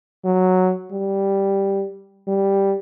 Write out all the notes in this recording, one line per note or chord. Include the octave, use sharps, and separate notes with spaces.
F#3
G3
G3